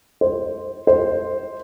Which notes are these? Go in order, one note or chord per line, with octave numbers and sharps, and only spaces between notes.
C5
C5